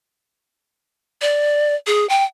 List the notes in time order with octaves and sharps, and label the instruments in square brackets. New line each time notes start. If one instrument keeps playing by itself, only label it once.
[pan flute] D5
G#4
G5